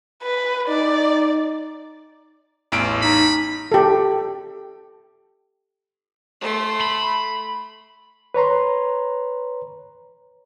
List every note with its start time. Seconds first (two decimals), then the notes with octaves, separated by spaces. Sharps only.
0.23 B4
0.68 D#4 D5
2.72 A1 E2 D7
3.02 D#4 B5
3.72 G4 A4
6.41 A3 C6
6.80 B5
8.34 B4 C#5 A#5 C6